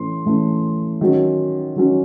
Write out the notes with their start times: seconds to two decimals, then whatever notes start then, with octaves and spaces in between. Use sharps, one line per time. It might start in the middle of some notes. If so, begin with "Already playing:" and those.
Already playing: A2 E3 A3 C#4 C6
0.25 A2 E3 A3 C#4
1.01 D#3 F#3 C#4
1.76 D#3 F#3 C#4